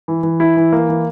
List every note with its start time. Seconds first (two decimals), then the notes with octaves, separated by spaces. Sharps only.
0.08 E3
0.23 E3
0.40 E4
0.57 E3
0.73 A#3
0.89 E3